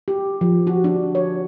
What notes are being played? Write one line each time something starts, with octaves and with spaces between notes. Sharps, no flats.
G4
F3
F#4
D4
C#5